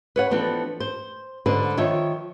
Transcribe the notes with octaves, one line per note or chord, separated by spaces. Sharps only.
B4 C#5 F#5
E3 F3 B3 C4 D4 A4
C5
G#2 D3 B4 C5
D#3 F3 C#5 E5